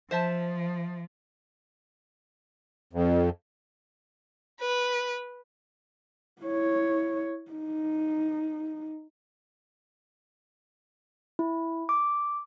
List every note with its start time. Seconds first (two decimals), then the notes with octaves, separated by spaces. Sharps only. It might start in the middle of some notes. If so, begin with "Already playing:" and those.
0.11 F3 C5 E5 A5
2.93 F2
4.60 B4
6.42 E4 C#5
7.51 D#4
11.39 E4
11.89 D6